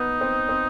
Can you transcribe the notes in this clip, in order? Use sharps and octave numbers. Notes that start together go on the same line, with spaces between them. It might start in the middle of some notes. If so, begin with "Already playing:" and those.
Already playing: B3 D#4
C4
C4